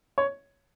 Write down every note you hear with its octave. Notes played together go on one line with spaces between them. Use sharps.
C#5